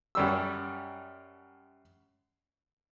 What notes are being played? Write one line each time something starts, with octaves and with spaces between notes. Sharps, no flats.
F#2 G3 E6